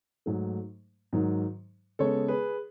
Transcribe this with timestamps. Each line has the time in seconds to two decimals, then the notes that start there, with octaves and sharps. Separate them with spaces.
0.26 G#2 F#3 A3
1.13 G#2 D#3 F#3
1.99 C#3 G#3 B3 A4 C#5
2.28 G#4 B4